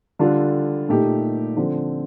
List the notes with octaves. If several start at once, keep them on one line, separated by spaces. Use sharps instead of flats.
D3 G3 D4 F4 A4
A#2 A3 D#4 G4
D3 F3 C4